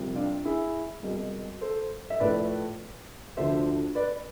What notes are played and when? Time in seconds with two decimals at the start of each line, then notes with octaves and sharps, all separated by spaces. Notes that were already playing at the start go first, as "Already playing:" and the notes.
Already playing: C2 C3 F3
0.15 D4 F4
0.45 E4 G#4
1.03 C2 B2 G#3
1.61 A4 C5
2.10 E5
2.20 A2 F3 A3 B4 D5
3.37 D2 D3 F3 C5 E5
3.95 B4 D5